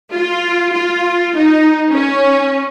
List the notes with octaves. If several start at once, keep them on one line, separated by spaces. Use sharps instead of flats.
F4
F4
D#4
C#4